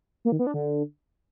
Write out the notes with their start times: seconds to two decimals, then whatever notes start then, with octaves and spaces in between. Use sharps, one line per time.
0.25 A#3
0.32 D#3
0.39 B3
0.47 D4
0.54 D3